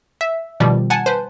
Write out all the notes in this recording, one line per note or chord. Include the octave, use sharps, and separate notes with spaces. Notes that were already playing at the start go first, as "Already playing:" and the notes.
E5
B2 D#3 F3 G3
F#5 G#5 A5
B4 C5